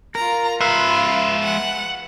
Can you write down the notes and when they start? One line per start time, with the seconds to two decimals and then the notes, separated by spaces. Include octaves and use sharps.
0.15 F4 A#4 A#5
0.61 G#3 F4 B4 E5 F5
1.43 F#5